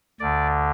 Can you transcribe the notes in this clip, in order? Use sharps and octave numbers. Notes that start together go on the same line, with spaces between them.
D2 D3 D5